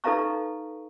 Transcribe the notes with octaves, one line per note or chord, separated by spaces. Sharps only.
D#4 A4 B4 F5 A#5 C#6